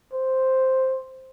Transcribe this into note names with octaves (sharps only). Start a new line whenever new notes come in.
C5